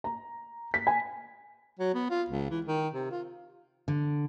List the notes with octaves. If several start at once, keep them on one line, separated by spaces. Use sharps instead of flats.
A#5
B6
G#5
F#3
B3
F4
C#2
E3
D#3
C3
F4
D3